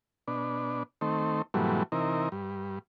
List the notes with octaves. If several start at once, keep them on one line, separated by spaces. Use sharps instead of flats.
B2 D4
D#3 A3 C4
G#2 B2 E3 F#3 G3 A3
C3 E3 D#4 A#4
G2